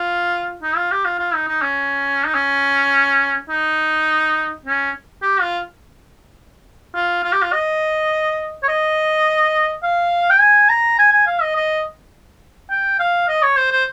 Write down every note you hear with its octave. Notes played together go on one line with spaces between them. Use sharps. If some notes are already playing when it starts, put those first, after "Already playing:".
Already playing: F4
D#4
F4
G4
F4
F4
D#4
D#4
C#4
D#4
C#4
D#4
C#4
G4
F4
F4
F4
G4
F4
D#5
C#5
D#5
F5
G5
G#5
A#5
G#5
G#5
F5
D#5
D#5
G5
F5
D#5
C#5
C5
C5